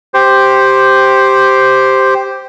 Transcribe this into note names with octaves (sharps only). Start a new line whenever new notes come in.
G4 C5